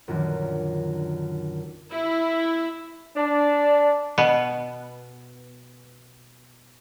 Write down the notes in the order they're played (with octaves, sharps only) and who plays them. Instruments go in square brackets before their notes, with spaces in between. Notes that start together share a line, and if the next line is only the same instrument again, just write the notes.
[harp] A#1 F#2 D3 D#3
[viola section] E4
[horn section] D4
[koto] B2 B3